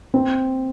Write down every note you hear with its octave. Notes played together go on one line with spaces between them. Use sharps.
C4